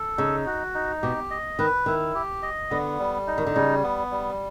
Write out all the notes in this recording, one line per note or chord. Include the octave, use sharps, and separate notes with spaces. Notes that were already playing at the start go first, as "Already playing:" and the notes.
Already playing: A4
C#3 D#4
F#4
D#4
B2 G4
D#5
D#3 B4
D#3 E4
G4
D#5
D3 B3
G3
D#4
D#3
D3
C#3 G3
B3
G3